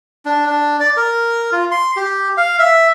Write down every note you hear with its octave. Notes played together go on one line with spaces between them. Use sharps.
D4
D4
D5
A#4
F4
C6
G4
F5
E5